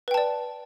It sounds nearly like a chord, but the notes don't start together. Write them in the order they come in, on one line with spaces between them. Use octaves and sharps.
B4 G5 A5 D5